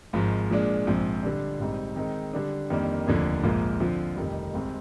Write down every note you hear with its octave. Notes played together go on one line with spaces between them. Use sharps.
G#1 G#2 F3
A#2 F3 G#3 D4
A#1 G#2 F3 C4
D3 G3 D4
A#1 G#2 G3 C4 D#4
D#3 G#3 C4 D#4
D3 G3 D4
F2 D#3 G3 A#3 D4
F1 D#2 D3 F3
A#1 G#2 F3 A#3 F4
D3 F3 C4 F4
F1 F2 C3 D#3 G3
G#1 G#2 G3 C4